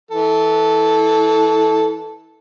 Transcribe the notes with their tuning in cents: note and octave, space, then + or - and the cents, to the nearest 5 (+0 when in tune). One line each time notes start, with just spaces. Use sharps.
E3 -25 A4 -5